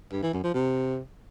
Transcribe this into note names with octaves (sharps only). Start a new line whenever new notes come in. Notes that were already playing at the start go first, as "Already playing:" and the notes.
G2
E3
F#2
F3
C3